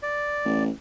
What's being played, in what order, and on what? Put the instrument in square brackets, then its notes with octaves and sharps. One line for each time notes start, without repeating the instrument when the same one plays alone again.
[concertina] D5
[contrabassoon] A1